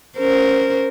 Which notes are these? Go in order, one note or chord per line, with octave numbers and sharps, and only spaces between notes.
C#4 A#4 C5